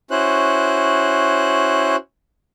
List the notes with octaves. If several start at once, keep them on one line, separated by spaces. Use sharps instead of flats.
C#4 E4 F#4 C5 F#6